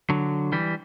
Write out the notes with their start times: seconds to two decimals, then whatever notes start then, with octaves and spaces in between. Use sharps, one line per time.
0.10 D3 F#3
0.52 E3 G3